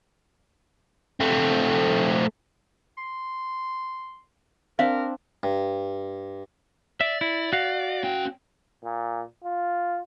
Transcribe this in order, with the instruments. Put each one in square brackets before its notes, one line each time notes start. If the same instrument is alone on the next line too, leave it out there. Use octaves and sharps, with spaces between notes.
[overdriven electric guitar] A3 C4
[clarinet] C6
[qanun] C4 D4 [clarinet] A#4 [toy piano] F5
[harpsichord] G2
[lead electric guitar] D5 [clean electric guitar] E5
[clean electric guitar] E4
F#4 F5
[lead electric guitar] C#4 G5
[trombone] A#2
F4